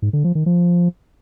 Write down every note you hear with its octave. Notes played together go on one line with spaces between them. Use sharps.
G#2
D3
F3
D#3
F3